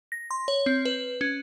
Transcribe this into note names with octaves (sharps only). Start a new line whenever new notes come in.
A#6
C6
C#5
C4
B4
C#4